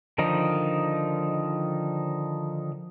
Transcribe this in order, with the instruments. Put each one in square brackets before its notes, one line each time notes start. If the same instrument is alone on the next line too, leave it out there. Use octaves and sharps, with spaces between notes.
[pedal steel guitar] D3 D#3 F3 D#4